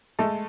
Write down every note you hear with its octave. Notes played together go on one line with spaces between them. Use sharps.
G#3 A3 A4